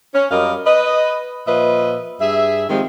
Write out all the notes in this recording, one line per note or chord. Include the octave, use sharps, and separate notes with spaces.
C#4
F#2 G3 A#4 D#5 F5
B4 D#5
A#2 F3 B4 D#5 E5
G2 G#4 E5
D#3 F3 G#3 C4 G4